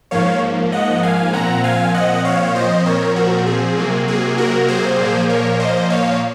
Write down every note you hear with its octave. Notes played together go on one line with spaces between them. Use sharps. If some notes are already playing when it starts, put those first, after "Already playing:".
G#2 F3 A#3 C#5 F5
D#5 F#5
F5 G#5
A#2 F3 C4 F#5 A#5
F5 G#5
D#5 F#5
C#5 F5
A#2 F3 C4 C5 D#5
A#4 C#5
F#4 A#4
G#4
C3 F#3 A#3
G#4
F#4 A#4
G#4 C5
A#2 F3 A#3
A#4 C#5
C5 D#5
C#5 F5